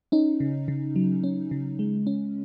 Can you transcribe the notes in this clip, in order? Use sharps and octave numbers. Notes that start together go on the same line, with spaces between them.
C#4 D#4
C#3
C#3
F#3
C#4
C#3
G#3
C#4